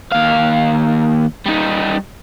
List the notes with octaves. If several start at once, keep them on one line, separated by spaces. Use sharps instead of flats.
D#2 F5
G3 D#4